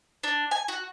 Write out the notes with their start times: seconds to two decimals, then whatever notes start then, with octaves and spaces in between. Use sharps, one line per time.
0.23 D4
0.51 G#5
0.68 F#4